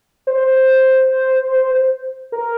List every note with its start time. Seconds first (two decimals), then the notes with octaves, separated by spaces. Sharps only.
0.27 C5
2.32 A#4